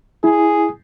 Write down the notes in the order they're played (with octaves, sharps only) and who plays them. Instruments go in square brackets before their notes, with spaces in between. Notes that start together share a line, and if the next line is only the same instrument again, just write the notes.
[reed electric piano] E4 [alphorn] G#4